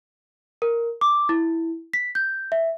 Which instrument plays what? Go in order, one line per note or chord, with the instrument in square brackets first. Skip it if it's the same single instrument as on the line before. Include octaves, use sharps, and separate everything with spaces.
[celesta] A#4
D6
E4
B6
G6
E5